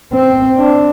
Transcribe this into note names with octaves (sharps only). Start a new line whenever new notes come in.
C4
D4